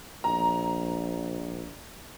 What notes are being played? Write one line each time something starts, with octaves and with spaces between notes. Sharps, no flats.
A#1 A#5